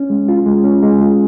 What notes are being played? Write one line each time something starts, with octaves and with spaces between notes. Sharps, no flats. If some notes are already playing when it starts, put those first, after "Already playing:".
Already playing: C#4
G#3
F4
G#3
C#4
G#3
F4